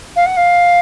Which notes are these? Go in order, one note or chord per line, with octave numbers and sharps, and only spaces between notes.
F5
F#5
F5